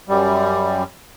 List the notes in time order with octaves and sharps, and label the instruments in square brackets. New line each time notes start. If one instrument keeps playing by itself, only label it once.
[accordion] F#2 G3